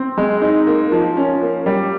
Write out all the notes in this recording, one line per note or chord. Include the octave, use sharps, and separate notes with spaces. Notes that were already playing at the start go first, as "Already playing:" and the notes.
Already playing: C4
G#3
D#4
A#3
F3
C#4
A#3
G3